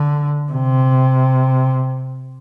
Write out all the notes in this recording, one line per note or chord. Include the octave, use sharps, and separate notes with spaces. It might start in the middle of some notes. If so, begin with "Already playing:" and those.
Already playing: D3
C3